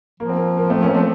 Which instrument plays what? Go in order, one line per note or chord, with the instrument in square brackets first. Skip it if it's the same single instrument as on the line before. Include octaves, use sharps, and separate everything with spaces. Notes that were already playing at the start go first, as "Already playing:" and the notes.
[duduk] F3 [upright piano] A#3
[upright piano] C4
A#3
A#3
A3 C4
A#3 C#4
A3 C4